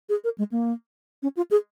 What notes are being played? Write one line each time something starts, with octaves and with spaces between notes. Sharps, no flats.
G#4
A#4
G#3
A#3
C#4
F4
G#4